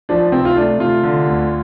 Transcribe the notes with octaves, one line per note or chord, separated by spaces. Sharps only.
F3 D4
C3 C4
F4
A3 D4
C3 F4
D3
D2